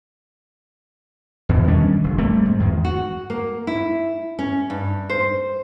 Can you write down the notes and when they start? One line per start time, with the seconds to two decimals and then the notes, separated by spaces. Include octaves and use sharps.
1.49 E2 B2
1.67 D#3 G3 C#4 D4
2.04 F1
2.18 G3 A3 A#3 C4
2.45 G#2
2.60 E2 D#3
2.85 F#4
3.30 A#3
3.67 E4
4.39 C#4
4.70 G2
5.09 C5